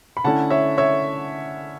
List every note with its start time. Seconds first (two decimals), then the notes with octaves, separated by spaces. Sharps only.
0.17 B5
0.24 D3 A3 C#4 E4 F#5 A5
0.51 C#5 E5
0.78 C#5 E5